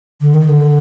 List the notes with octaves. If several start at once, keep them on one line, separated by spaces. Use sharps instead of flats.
D3
D#3
D3